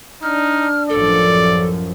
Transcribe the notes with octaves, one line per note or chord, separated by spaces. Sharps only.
D4 D#4 F6
A1 F#2 F3 A4 D5